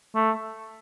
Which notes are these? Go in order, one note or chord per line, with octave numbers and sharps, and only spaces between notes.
A3